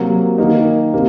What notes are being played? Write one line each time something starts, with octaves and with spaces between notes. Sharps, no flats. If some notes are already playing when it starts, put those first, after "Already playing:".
Already playing: C3 F#3 A#3
D#3 A#3 D#4
C3 A#3